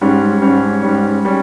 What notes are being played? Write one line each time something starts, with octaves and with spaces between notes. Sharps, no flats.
G#2 G3 C#4
G#2 G3 C#4
G#2 G3 C#4
G3 C#4